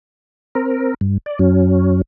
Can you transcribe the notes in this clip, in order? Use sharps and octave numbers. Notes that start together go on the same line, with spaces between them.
C4 A#4
G2
D5
F#2 F#3 C#4